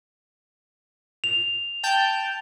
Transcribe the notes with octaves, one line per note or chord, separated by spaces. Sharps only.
F7
G5 A5 G6